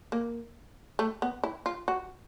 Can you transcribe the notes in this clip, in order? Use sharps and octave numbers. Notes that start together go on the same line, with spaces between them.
A#3
A3
B3
E4
F4
F#4